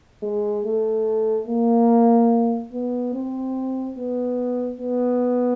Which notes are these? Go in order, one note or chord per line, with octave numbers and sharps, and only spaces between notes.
G#3
A3
A#3
B3
C4
B3
B3